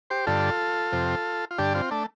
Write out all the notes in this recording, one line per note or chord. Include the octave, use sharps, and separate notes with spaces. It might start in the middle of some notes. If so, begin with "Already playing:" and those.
G4 C5
G2 D3 F4 A4
F2 C3
F4
G2 D3 D4 G4
C4 F4
A3 D4